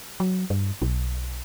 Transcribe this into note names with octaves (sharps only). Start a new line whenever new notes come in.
F#3
G2
B1